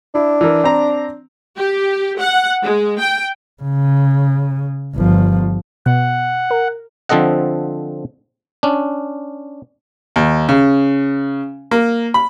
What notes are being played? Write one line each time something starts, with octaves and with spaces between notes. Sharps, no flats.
D4 E4
E3 A#4
C4 A#5
G4
F#5
G#3
G5
C#3
G1 F3
B2 F#5
A#4
D3 F3 C4 A4 D#5 F#5
C#4 D4
D#2
C#3
A#3
B5